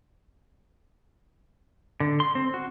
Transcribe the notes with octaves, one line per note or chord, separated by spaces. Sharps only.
D3
C6
C4
F#4